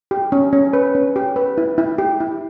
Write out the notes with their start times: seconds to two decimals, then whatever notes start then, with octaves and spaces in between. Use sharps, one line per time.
0.11 G4
0.32 C#4
0.53 C#4
0.73 B4
0.95 C#4
1.16 G4
1.36 B4
1.58 E4
1.78 E4
1.98 G4
2.20 E4